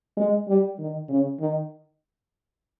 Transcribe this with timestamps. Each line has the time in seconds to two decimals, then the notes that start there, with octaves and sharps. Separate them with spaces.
0.17 G#3
0.48 G3
0.79 D#3
1.09 C#3
1.40 D#3